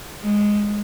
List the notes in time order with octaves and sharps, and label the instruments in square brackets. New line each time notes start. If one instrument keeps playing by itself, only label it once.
[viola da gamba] G#3